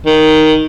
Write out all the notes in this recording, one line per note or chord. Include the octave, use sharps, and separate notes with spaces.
D#3